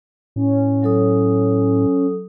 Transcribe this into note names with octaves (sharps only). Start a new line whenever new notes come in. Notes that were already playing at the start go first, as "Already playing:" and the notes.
A2 C#4
F#3 A4 D#6